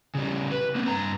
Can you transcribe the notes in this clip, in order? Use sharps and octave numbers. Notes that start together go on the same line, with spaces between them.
C#3 G3
B4
A#3 C4
G2 A#5